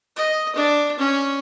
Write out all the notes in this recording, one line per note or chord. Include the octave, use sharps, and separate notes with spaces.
D#5
D4
C#4